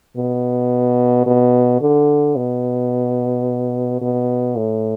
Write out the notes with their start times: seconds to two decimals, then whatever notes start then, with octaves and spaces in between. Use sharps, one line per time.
0.17 B2
1.26 B2
1.81 D3
2.36 B2
4.01 B2
4.56 A2